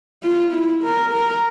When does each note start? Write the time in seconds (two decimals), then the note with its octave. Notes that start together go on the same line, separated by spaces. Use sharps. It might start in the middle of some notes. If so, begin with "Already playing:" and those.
0.23 F4
0.52 E4
0.84 A#4
1.13 A#4